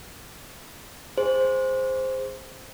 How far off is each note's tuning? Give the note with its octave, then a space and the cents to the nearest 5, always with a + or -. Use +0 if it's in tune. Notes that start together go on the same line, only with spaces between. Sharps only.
G#4 -15 C5 +0